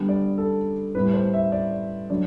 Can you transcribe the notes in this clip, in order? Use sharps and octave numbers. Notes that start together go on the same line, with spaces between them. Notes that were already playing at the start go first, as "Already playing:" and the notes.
Already playing: D3 G3 B3
D5
A4
A2 G3 B3 B4
C5
E5
D5
D3 F#3 D5